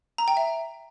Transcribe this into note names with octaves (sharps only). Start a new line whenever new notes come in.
A#5
G5
E5